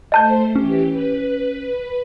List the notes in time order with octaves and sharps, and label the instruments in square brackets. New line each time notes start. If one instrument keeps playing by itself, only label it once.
[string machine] A3 C5 [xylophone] D#5 A5 G6
[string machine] E3 G4 [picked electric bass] C#4
[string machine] B4